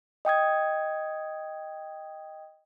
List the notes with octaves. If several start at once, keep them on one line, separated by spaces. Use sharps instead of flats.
D#5 G5 D#6 G#6